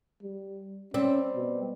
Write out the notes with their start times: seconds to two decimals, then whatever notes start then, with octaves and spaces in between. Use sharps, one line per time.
0.23 G3
0.94 G3 C4 C#4
1.35 B2